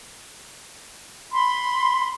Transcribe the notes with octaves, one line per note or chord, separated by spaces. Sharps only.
B5 C6